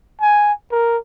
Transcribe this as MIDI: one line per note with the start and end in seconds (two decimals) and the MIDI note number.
0.21 0.53 80
0.71 0.98 70